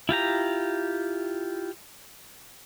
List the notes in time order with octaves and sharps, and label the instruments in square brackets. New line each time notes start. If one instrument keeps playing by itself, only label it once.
[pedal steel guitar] E4 F4 G4 A#5